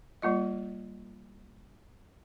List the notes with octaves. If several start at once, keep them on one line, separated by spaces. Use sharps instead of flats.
G3 A#3 F4 D#5